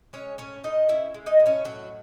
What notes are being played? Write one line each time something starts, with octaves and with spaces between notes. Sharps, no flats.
G#3 C#4 C#5
A2 C#4 C#5
A2 D#4 D#5
C#4 E4 E5
G#3
D#4 D#5
A2
C#4 C#5
A2 F#3 F#4